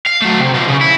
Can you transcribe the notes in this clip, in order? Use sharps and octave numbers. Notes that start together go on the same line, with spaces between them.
F5
F#3 A3
C3
B2 F3
C#3
E4